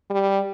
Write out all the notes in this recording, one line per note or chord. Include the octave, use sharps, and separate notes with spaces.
G3